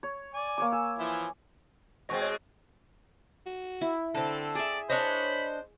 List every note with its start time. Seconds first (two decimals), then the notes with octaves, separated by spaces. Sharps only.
0.03 C#5
0.34 D5 G#5
0.58 A#3 C#5 D6
0.72 G#5 E6
0.98 E3 F3 E4
2.09 B2 G#3 C4 D#5 C#6 A#6
2.22 C#5
3.46 F#4
3.81 E4
4.15 D3 C4 A4
4.55 G#4 D5 E5
4.90 D4 C5 C#5 D#5 B5